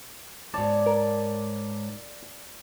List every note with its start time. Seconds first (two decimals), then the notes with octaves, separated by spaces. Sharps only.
0.54 G#2 C#5 D5 A5
0.86 A#4